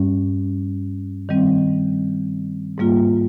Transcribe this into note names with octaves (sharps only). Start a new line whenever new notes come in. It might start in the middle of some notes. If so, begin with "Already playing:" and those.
Already playing: G2 G3 C#4
D#3 G3 C4
G#2 G3 A#3 F4